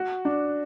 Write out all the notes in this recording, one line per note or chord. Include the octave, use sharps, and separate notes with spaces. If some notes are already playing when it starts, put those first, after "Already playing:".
Already playing: F#4
D4